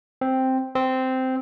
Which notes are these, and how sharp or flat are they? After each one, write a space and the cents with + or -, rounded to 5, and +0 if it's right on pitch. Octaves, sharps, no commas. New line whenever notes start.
C4 +0
C4 -10